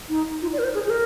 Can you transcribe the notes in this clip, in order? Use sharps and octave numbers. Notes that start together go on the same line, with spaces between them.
D#4
F4
D5
A#4
C5
G#4
G#4
A#4